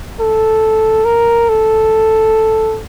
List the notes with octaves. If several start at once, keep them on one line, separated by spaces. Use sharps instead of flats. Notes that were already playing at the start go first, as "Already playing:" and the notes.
A4
A#4
A4